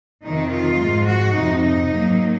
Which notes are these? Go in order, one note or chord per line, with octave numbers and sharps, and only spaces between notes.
F2 C3 D#3 D#4
F4
G#2 F3 G#3
F#4
F2 C3 F3 D#4
D#4
G#2 F#3 A#3